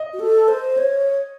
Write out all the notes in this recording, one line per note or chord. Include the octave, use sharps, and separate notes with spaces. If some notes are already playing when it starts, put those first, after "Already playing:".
Already playing: D#5
F#4
A4
C5
C#5